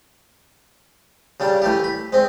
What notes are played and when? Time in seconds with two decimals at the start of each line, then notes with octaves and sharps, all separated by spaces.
1.40 C#3 G3 D4
1.62 E3 A3 G4
1.84 B5
2.13 G#3 C4 C5